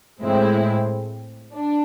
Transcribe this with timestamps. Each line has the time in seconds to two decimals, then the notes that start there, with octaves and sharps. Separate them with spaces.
0.21 A2 G#3 C4 E4
1.54 D4